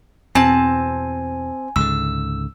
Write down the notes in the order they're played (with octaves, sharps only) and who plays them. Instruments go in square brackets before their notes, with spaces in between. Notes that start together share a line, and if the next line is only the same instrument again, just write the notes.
[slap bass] E2 B2 [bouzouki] C4 A5 [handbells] G#5
[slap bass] C#2 G#2 D3 [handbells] E6